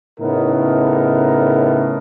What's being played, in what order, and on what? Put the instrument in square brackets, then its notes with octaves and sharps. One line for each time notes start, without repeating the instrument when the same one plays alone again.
[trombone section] A2 C#3 B3 D#4 A#4